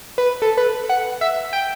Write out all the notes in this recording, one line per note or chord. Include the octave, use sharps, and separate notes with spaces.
B4
A4
B4
F#5
E5
G5